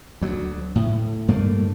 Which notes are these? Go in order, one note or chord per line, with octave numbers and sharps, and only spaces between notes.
D2 F#3
A2
G2 A3 A#3